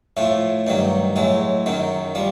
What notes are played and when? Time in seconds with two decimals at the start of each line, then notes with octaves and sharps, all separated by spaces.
0.17 A2 F3 A3
0.67 G2 D#3 F#3
1.16 A2 F#3 G#3
1.66 F#2 D#3 F#3
2.15 F3 G3